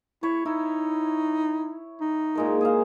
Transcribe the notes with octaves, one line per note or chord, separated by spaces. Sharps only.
E4 C#5
D#4 E4
D#4
A#2 G#3 A#4
G#4 C5 F5